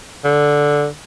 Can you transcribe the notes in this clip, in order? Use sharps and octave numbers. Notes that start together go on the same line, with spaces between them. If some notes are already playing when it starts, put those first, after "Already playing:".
D3